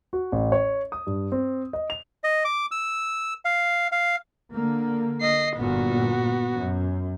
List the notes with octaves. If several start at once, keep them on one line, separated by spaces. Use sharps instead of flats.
F#4
A1
C#5
D#6
G2
C4
D#5
F7
D#5
D6
E6
F5
F5
D3 A#3
D#5 C7
G1 A#2 B3 F#4
F#2